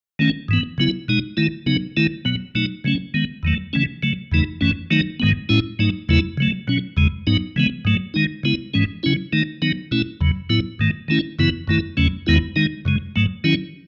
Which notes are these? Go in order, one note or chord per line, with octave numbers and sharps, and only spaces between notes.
D#3 A3 C#4
G#2 E3 B3
C#3 F#3 B3 E4
B2 G#3 D#4
D#3 A3 E4
C#3 F#3 B3 D#4
D#3 A3 E4
B2 F#3 B3
B2 F#3 A3 D#4
C#3 F#3 A3 C#4
D#3 G#3 B3
E2 D#3 F#3 A3
C#3 E3 A3 C#4
C#3 F#3 A3
E2 C#3 E3 A3 D#4
F#2 E3 A3 C#4
D#3 F#3 A3 D#4
G#2 D#3 G#3 B3
A2 G#3 C#4 E4
G#2 F#3 A3 D#4
E2 C#3 F#3 A3 E4
C#3 F#3 A3
B2 F#3 C#4
E2 C#3 G#3
G#2 F#3 B3 D#4
C#3 E3 G#3 B3
G#2 F#3 A3
D#3 G#3 D#4
C#3 G#3 B3 E4
G#2 E3 G#3 C#4
C#3 F#3 C#4 E4
D#3 A3 D#4
D#3 F#3 B3 D#4
B2 A3 C#4 E4
E2 C#3 F#3
A2 F#3 B3 E4
G#2 D#3 A3
D#3 A3 C#4 E4
F#2 C#3 E3 B3 E4
F#2 D#3 A3 E4
E2 C#3 F#3 A3 C#4
E2 D#3 G#3 B3 E4
D#3 G#3 D#4
F#2 C#3 G#3
G#2 F#3 A3
D#3 F#3 C#4 E4